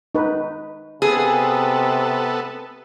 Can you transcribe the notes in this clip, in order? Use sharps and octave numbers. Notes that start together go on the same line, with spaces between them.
D#4 B4
C3 B3 G#4 A4